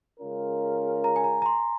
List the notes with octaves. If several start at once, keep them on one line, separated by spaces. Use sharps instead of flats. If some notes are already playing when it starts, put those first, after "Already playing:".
C#3 G#3 C#4 F4 A#4
A#5
G#5
A#5
A#5
C6